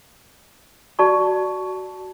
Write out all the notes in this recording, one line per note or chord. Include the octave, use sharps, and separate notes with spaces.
F#4 D5 A5 C#6